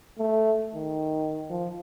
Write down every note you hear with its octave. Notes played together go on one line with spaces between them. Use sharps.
A3
D#3
F3